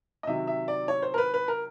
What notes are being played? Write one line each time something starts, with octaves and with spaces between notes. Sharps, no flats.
D#5
C3 D#3 F#3 E5
E5
D5
C#5
C5
A#4
B4
B4
A#4